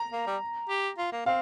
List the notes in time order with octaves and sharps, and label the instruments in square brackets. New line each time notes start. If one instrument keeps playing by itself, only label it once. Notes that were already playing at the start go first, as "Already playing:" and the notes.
Already playing: [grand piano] A#5
[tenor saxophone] A#3
G3
G4
F4
A#3
[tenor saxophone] C4 [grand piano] F5